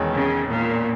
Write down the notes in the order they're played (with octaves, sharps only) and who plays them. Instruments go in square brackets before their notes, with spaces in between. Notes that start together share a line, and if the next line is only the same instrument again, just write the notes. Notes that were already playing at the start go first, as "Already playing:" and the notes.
Already playing: [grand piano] E1 E2 D#3 G#3 C#4
[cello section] C#3
A#2